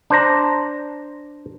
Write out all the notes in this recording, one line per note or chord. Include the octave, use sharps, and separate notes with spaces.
D4 C5 A#5